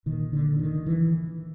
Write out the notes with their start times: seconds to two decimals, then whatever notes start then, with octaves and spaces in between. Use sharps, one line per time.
0.06 A#2 D#3
0.33 D3
0.59 D#3
0.86 E3